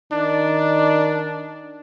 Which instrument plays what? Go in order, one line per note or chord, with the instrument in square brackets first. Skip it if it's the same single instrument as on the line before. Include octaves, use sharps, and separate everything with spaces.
[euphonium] D#3 [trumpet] D4